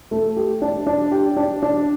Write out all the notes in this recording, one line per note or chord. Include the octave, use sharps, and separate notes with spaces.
A3
G4
D4
D4
G4
D4
D4